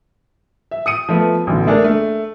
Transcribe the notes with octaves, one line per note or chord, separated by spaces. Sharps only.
E5
D#6 C#7 D#7
F3 A3 B3
A1 B2 D3
A3 D4 G#4 A#4
A3